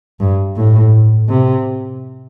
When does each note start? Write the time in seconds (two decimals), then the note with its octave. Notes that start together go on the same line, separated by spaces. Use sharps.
0.20 G2
0.56 A2
1.29 C3